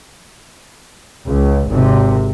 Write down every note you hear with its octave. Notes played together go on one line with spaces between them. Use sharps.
C#2
G#1 C3